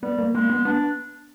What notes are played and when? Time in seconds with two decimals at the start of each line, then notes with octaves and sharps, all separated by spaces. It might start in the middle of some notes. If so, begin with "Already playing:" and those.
0.03 G3 B3
0.18 A#3
0.34 G#3 A#3
0.50 B3
0.65 B3 D4